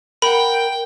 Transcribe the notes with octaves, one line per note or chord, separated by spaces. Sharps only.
A#4 F#5 G5 B5